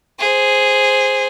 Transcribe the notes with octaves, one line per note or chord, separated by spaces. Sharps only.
G#4 C5